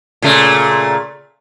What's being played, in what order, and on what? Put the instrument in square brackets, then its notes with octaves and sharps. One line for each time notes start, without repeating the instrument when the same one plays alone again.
[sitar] A#2 C#3 A3